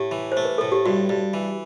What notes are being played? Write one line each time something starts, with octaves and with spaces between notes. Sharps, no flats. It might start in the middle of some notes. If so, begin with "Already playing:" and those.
Already playing: A2 G4
E3
C5
A3
B4
A2 A4
G4
G2 F#4
G2
E3